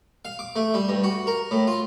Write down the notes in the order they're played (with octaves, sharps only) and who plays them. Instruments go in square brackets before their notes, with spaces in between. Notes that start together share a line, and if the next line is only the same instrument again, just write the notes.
[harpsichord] F5
D6
A3
G3
G2
F#4
A#4
A2
F4